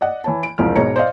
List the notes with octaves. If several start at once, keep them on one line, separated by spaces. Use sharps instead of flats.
D5 D#5 F#5
E3 C#5 A5
D7
E1 C2 F3 F6
G#2 B2 C#5 D#5 A#5 C#7
C5 D5 D#5 F5